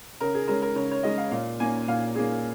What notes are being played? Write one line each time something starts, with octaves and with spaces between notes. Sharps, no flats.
C#3 A#4
G#4
G#3 C#4 A#4
A#4
C#3 C#5
C#5
G#3 C#4 D#5
F5
A#2 F5
A#3 C#4 G#5
A#2 F5
A#3 C#4 G#4